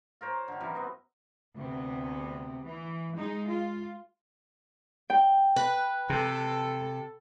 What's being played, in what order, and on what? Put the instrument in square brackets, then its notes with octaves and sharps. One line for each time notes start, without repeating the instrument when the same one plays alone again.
[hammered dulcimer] F4 A#4 C5 C#5
D3 D#3
F#2 C3 E3
B3 C4
[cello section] D2 C3 B3
E3
G#3 D#4
F4
[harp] G5
[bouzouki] B4
[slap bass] C3 [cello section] A4